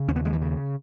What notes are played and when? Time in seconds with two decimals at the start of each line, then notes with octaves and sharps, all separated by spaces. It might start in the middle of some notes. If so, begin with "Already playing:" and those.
Already playing: C#3
0.08 D#2 C#4
0.16 B3
0.25 D#2 G#3
0.33 E3
0.41 C#3